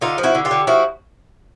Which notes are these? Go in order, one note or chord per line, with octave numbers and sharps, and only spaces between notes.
D3 D#4 F4
F3
E4 F#4
D3
F4 G4
D3
F3 E4 F#4